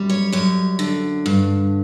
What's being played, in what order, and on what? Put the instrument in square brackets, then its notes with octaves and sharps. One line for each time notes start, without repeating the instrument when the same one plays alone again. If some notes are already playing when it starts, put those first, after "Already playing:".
Already playing: [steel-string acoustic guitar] F#2 G3
C#5
F#2 C#5
D3
G2